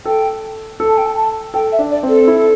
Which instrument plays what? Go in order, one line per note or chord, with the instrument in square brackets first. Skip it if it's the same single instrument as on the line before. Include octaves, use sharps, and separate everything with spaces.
[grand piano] A4 [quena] G5
[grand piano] A4
[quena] A5
G5
A5
A5
[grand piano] A4 [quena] G5
[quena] E5
[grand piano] D4
[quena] D5
[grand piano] C4
[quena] A4
[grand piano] E4